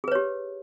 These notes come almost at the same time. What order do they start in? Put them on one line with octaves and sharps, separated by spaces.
G#4 B4 C#5 G4